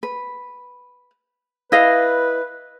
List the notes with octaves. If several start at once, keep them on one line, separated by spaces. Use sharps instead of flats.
B4
E4 B4 D#5 F5